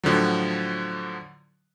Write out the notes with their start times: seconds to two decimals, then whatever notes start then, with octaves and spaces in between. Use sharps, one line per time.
0.04 A2 D3 F3 F#3